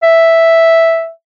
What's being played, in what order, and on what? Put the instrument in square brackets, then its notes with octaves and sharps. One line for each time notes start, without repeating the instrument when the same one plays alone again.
[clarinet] E5